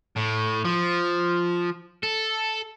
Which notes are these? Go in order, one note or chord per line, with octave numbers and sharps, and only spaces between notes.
A2
F3
A4